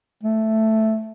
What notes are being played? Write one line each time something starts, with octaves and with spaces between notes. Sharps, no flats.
A3